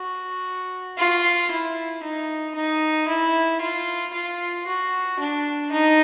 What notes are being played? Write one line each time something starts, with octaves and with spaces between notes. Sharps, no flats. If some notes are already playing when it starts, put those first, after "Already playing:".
Already playing: F#4
F4
E4
D#4
D#4
E4
F4
F4
F#4
D4
D#4